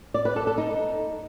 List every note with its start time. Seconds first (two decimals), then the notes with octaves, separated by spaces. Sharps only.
0.14 D5
0.25 B4
0.36 A4
0.47 A4
0.58 D#4